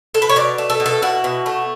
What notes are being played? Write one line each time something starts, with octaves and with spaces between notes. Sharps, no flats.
A4
B4
C#5
B2 D5
A3
A4
B2
A4
E4 F#4
B2
A3